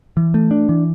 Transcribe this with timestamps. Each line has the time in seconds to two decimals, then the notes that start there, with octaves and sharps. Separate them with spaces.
0.17 E3
0.34 A3
0.51 D4
0.69 E3